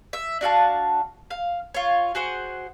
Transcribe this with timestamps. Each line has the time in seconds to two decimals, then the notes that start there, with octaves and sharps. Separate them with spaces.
0.13 E5
0.41 D4 F#4 F5 A5
1.30 F5
1.74 F4 C#5
2.15 F#4 G#4 C5 F#5